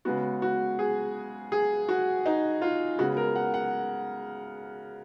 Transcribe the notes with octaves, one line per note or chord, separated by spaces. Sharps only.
C#3 G#3 B3 F#4
F#4
G#4
G#4
F#4
D#4
F4
C#3 G#3 B3 F#4
A#4
F#5
F#5